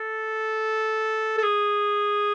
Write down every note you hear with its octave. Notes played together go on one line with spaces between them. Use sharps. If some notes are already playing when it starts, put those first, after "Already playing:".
Already playing: A4
A4
G#4